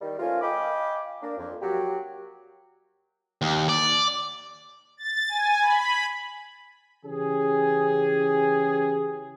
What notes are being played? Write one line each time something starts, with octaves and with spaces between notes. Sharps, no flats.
D#3 G3
F3 A3 A#3 C#4 F4
D#5 F5 G5 G#5 B5 D6
A#3 D4
F2
F#3 A#3 F#4 G4
D#2
D5
A6
G#5
B5
C#3 E3 C#4 G4 G#4